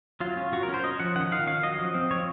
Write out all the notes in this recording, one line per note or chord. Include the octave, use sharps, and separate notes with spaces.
F#3 F4
C#4
F#3 F#4
A#4
C#4
C5
C#4 D#5
F3 F#5
D#3 F#5
D#3 F5
C#4 F5
F#3 D#5
F3
C4
F3 C#5